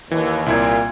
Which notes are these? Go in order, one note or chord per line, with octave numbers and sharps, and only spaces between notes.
D#2 E3
C2 A#2 E4 G#6